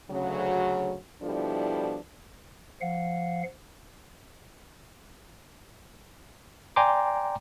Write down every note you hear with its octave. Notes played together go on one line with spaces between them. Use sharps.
D2 C#3 F#3
B2 F3 G3 D4 E4 A4
F3 F5 F#5
D5 G5 G#5 A#5 C6 D6